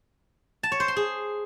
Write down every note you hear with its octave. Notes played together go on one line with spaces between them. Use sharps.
A5
C#5
C5
C6
G#4